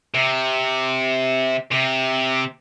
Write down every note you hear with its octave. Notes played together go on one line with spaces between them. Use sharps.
C3
C3